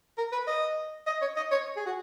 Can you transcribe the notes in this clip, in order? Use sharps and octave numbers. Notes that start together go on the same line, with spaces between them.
A#4
B4
D#5
D#5
C#5
D#5
C#5
G#4
F#4